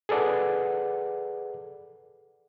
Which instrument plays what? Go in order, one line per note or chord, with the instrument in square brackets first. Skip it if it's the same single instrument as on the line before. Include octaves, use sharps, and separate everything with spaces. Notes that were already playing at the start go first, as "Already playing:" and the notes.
[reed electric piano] G#4 A4 B4 D5 F#5